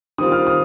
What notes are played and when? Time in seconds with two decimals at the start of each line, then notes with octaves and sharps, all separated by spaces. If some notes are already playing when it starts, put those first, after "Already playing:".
0.18 D#3 G3 C4 F4 D#6
0.32 F6
0.47 D#6